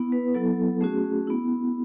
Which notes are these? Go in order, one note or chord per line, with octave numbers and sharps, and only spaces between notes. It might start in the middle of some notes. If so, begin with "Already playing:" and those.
Already playing: B3 E4
B4
F#3 B3 E4 A4
A3 C#4 F#4 G#4
B3 E4